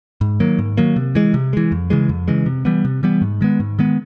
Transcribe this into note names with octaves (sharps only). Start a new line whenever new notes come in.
G#2
D#3 F#3 A#3
G#2
D#3 F#3 A#3
C3
E3 G#3
C3
E3 G#3
F2
C#3 E3 G#3
F2
C#3 E3 G#3
C3
E3 G3 B3
C3
E3 G3 B3
G#2
D#3 G#3 B3
G#2
D#3 G#3 B3